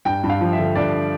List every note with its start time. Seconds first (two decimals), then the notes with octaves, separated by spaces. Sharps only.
0.05 G2 G5
0.24 G2
0.29 F5
0.41 F3
0.53 E5
0.59 D3
0.75 G2 D5